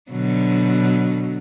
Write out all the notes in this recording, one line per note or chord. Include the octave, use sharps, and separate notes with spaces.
B2 D3 F#3